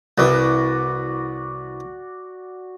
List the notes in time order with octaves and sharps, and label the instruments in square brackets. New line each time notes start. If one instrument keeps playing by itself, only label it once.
[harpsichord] C2 E3 [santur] F#4 D5